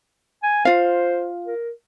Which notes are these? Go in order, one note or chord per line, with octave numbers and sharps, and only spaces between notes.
G#5
F4 C5 F5
A#4